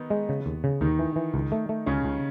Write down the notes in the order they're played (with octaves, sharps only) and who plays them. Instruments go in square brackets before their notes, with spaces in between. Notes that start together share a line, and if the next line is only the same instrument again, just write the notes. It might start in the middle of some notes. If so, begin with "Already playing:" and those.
Already playing: [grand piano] D#3 B3 D#4
[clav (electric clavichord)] G#3
C#3
D#2
C#3
[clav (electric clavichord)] D#2 [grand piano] D#3 D#4
[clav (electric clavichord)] E3
E3
C#2
A3
A3
[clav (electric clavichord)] C#2 [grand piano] C#3 C#4
[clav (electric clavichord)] C#2